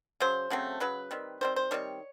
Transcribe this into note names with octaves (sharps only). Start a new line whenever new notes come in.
C#3 F#3 C5
C#3 F#3 A3 C4
C#3 F#3 B4
D#3 G3 C4
D#3 G3 C4 C5
C5
D#3 G3 C4 C#5